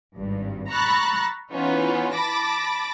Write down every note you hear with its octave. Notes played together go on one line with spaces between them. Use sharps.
G#1 G2
A#5 B5 C#6 E6 F#6 A6
E3 B3 C#4 D#4 F4
A5 B5 D6 A6 A#6